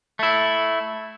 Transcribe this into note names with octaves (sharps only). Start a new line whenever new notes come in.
A3 E4